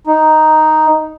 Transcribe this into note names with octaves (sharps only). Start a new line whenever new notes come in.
D#4